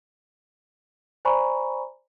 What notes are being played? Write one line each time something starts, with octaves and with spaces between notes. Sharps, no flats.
C5 D5 G#5 A#5 B5 C#6